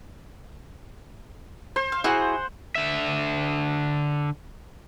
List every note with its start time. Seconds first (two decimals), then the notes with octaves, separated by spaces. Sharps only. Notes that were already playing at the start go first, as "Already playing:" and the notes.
1.76 C5
1.92 F5
2.04 E4 F#4 G#4 F#5
2.75 D3 E5